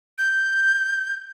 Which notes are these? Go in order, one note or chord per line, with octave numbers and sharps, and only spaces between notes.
G6